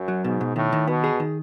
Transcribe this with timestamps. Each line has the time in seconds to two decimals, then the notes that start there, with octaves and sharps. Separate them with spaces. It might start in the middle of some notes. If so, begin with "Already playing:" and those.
Already playing: F#2
0.08 F#3
0.24 G#2 B2
0.41 B2
0.56 A2 D#3
0.72 D#3
0.87 B2 B3
1.04 G#4
1.20 D#3